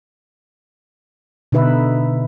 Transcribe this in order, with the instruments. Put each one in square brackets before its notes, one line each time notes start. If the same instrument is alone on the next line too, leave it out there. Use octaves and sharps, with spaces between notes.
[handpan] B2 D3 D#4 B4 E5